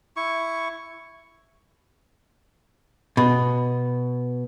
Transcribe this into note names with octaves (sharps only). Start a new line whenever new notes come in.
E4 C#6
B2